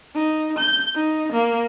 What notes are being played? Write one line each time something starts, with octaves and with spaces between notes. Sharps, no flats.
D#4
G6
D#4
A#3